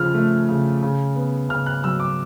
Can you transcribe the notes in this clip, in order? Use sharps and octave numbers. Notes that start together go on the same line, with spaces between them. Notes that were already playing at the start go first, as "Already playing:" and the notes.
Already playing: C#3 F3 F6
A3
C#3
C#3
B3
C#3 F6
F#6
F#3 E6
D6